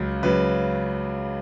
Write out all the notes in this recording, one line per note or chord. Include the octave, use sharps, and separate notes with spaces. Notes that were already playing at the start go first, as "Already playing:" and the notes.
Already playing: C#2 C#3 F#3
C#2 C#3 F#3 B4